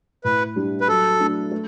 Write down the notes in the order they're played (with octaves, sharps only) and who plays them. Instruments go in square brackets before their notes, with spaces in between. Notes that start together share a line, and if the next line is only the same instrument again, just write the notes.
[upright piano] A2 [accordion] B4
[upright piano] G3 D4
[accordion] B4
[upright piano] F#3 [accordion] A4
[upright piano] A3 D4
A3